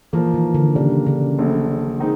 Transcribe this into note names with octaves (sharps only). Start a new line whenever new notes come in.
A#2 E3 F3 A#3
D#3
D3
A#2 C#3 G3 A#3 D4
C#3
A#1 A#2 F#3 A3
D#3 G#3 C4 D#4